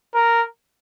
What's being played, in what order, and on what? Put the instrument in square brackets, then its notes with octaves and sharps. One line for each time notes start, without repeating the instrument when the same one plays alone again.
[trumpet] A#4